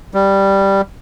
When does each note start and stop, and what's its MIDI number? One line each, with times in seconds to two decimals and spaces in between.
0.14 0.81 55